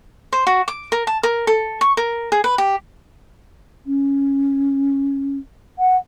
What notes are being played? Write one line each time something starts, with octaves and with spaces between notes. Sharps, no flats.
C5
F#4
D6
A#4
A5
A#4
A4
C#6
A#4
G#4
B4
G4
C#4
F#5